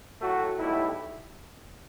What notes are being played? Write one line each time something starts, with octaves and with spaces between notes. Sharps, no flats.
A2 F#3 A3 F#4
B1 A2 G3 E4